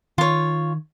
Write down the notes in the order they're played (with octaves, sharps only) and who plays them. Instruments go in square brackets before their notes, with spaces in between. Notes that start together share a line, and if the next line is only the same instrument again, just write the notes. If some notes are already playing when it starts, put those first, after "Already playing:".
[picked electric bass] D#3 [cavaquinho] F4 C#5